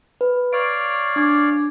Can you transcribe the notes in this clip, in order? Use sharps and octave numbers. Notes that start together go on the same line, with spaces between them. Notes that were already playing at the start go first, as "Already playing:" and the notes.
B4
C#5 D5 F5 D7
D4 D6 G#6